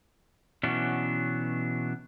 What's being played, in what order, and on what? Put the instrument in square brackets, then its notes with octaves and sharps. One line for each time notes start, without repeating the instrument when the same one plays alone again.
[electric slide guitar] B2 E3 F#3 B3 C#4 D4